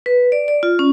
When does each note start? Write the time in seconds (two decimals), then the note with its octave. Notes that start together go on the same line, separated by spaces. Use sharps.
0.06 B4
0.32 D5
0.48 D5
0.63 F4
0.79 C#4